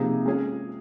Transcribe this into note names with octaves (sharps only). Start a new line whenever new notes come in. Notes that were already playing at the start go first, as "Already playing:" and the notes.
Already playing: C3 F3 A#3 D#4 G#4
G#3 C#4 G#4